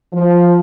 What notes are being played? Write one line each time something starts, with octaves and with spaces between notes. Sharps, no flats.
F3